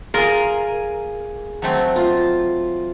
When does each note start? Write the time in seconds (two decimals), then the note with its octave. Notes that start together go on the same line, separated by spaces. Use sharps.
0.14 F4 G#4 A#4 G#5
1.62 F#3 A3 C4
1.96 F4